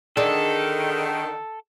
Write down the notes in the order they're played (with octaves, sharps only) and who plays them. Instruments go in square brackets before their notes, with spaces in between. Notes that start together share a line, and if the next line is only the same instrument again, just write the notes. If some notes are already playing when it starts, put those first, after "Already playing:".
[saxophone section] D3 D#3 [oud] D4 G#4 [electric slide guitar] A4